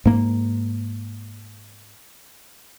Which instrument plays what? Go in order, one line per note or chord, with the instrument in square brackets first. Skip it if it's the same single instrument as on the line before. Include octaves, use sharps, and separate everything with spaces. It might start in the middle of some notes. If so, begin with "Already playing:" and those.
[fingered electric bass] G#2 A#3